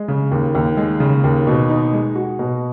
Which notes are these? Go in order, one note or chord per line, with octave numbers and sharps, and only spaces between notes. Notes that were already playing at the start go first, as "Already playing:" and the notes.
Already playing: G#3
C#3
D#2
D#2
G#3
C#3
D#2
B2
D#4
G#3
F#4
B2